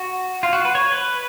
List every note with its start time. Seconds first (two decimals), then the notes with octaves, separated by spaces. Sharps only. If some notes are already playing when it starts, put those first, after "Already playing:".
Already playing: F#4
0.43 F4
0.53 F#4
0.65 B4
0.75 C#5
0.92 B4